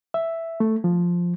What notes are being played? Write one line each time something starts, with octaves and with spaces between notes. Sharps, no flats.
E5
A3
F3